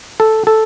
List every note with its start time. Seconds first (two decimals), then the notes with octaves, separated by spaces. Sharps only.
0.20 A4
0.47 A4